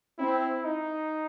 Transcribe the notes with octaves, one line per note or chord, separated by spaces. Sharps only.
C4 E4
D#4